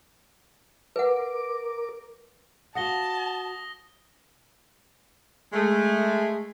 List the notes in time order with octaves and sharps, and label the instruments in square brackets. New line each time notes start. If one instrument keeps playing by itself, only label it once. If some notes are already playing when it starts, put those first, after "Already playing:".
[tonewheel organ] A#4 D6 [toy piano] B4 F#5
[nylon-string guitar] F#4 F5 F#5 [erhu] A5 [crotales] D#6 A#6 G7
[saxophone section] G#3 A3